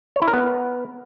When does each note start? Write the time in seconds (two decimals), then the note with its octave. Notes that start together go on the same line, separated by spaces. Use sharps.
0.16 C#5
0.22 E4
0.28 A#4
0.33 B3